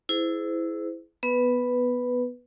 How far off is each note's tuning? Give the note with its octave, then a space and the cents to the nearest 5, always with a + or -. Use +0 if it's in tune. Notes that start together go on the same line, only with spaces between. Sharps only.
E4 +0 G#4 +20 C5 -30
B3 +0 B4 +0